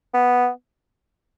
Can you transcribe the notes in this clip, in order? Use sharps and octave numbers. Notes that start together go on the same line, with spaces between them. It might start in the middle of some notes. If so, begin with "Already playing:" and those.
B3